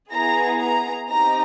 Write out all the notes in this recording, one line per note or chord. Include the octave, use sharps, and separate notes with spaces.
B3 E4 G#4 A#5
A#5
C4 D#4 G4 A#5